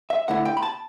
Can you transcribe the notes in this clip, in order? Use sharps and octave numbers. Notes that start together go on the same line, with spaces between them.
E5
D3 A3 E4 F#5
G5
B5
A5